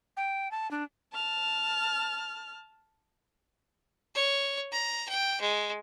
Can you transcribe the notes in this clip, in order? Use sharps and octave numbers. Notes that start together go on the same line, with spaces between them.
G5
A5
D4
A5 F6
C#5
A#5
G5
G#3